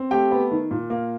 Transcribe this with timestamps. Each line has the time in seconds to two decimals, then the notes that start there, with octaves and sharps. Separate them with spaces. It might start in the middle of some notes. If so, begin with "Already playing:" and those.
Already playing: C4
0.11 A3 G4 G5
0.31 B3
0.51 D#3
0.71 A#2
0.90 A#3